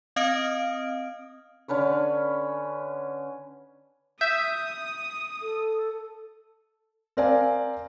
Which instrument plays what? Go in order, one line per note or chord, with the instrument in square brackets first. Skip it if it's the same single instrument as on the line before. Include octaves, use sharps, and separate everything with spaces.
[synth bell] C4 D#5 F5 D#6 F6 D7
[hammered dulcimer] D3 C#4 B4 C#5
[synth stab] E5 [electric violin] D#6 [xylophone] G6
[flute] A4
[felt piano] C4 A#4 D5 F5 G#5